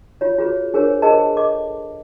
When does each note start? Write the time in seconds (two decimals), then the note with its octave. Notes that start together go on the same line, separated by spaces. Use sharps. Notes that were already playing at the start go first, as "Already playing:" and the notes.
0.21 F4 C#5
0.38 F4 F#4 G#4 B4 C#5
0.74 D4 G#4 A#4 C5 C#5
1.02 G#4 A#4 C5 D#5 A5
1.37 A4 D#5 D6